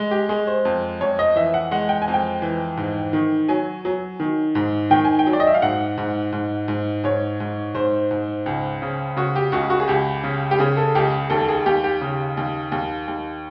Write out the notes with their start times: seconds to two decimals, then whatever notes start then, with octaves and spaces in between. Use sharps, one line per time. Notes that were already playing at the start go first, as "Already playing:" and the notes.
Already playing: G#3
0.11 G4
0.29 G#3 G#4
0.47 C5
0.65 F2
1.00 F2 C#5
1.19 D#5
1.36 E3 E5
1.54 F#5
1.71 G#3 F#5
1.89 G5
2.02 G#5
2.08 F2
2.14 G5
2.42 E3
2.77 G#2
3.13 D#3
3.48 F#3 G#5
3.85 F#3
4.20 D#3
4.55 G#2
4.91 D#3 G5
5.04 G#5
5.19 G5
5.27 F#3
5.33 D5
5.40 D#5
5.47 E5
5.54 F5
5.62 G#2 F#5
5.98 G#2
6.33 G#2
6.68 G#2
7.04 G#2 C#5
7.40 G#2
7.75 G#2 C5
8.11 G#2
8.46 C#2
8.82 C#3
9.17 C#3 F#4
9.36 G4
9.52 C#2 F#4
9.70 F#4
9.80 G#4
9.88 C#2 G4
10.24 C#3
10.51 G4
10.59 C#3 G#4
10.77 A4
10.95 C#2 G4
11.30 D#2 A4
11.49 G#4
11.66 D#2 G4
11.84 G4
12.01 C#3
12.37 D#2
12.72 D#2
13.08 D#2